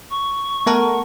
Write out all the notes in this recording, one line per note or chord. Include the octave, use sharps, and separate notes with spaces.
C#6
A3 B3 A#4 F#5 A5 A#5